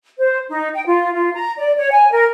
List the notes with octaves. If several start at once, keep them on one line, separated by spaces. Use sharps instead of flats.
C5
D#4
G5
F4
F4
A#5
D5
C#5
G#5
A#4